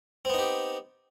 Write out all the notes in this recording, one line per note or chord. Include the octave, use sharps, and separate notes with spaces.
B3 C4 D#4 G4